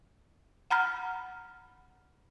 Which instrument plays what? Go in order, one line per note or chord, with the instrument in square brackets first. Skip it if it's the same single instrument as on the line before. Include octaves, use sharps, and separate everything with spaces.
[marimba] F#5 A#5 B5 F6